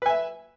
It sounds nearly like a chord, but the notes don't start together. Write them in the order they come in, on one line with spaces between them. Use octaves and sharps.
B4 G#5 E5